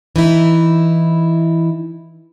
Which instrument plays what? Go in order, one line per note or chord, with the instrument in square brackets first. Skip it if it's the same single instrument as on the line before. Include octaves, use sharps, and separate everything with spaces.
[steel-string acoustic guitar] E3 D#4 E4